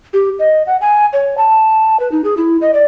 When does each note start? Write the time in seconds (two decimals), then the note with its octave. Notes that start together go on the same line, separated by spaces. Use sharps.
0.13 G4
0.39 D#5
0.67 F#5
0.81 G#5
1.13 C#5
1.38 A5
2.00 B4
2.12 D#4
2.24 G#4
2.37 E4
2.61 D#5
2.74 D5